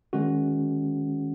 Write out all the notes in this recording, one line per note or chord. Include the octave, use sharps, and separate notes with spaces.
D#3 G#3 C#4 F#4